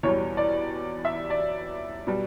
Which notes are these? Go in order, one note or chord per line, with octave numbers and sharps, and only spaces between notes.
E2 B2 G3 C#5
D5
E5
D5
B2 G3